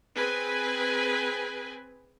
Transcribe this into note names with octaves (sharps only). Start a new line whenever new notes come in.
C4 G#4 B4 G#5